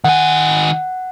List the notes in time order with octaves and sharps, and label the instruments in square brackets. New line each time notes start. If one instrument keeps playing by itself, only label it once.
[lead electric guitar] D#3 G#5 [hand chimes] F#5